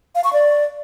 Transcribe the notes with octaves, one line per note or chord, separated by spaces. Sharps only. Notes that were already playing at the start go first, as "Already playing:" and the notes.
F5
C#6
D5